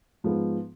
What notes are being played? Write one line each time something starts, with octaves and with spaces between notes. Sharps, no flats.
G#2 F3 G#3 B3